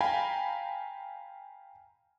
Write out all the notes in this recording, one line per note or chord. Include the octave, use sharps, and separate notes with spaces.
F5 G5 G#5 A#5 B5